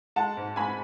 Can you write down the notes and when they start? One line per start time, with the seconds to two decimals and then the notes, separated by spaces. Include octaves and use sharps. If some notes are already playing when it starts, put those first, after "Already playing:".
0.16 G#3 F#5 A5
0.37 G#2
0.56 G#3 G#5 B5